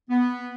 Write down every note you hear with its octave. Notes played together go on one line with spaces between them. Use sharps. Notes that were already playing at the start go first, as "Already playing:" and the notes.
B3